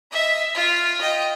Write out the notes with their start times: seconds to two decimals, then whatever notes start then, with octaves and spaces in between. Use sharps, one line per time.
0.12 D#5 E5
0.55 F4
1.01 D#5 G5